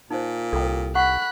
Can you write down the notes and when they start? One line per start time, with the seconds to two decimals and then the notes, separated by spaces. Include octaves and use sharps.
0.11 A#2 D#4 C5
0.53 C2 A4 G5
0.95 F#5 B5 C#6 F#6